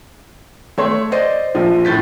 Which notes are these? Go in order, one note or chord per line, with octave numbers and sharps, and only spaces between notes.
A3 C#5 C6
C5 D5 D#5
A#1 F3
F#2 A2 G6 A6 B6